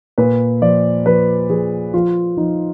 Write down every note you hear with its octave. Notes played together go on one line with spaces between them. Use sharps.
A#2 B4
F3 D5
F3 B4
F3 G#4
F3 F4
F3 D#4